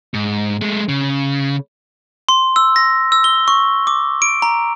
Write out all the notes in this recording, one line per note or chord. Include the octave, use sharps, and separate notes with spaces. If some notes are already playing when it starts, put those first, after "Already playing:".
G#2
G#3 A3
C#3
C6
E6
A#6
E6
G7
C#6
D6
D7
A#5